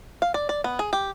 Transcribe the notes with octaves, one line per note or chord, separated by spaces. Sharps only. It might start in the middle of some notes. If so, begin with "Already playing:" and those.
F5
D5
D5
B3
G#4
G4